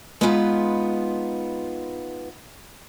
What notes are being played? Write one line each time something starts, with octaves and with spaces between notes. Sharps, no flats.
G#3 B3 D#4 F4 B4